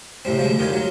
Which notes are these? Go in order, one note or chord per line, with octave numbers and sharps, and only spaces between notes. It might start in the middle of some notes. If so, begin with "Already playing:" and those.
C2 A2 G3 C4
D2 F3 G3 G#3
F2 D#3 F4 G4 D5 G#5
F#3 F4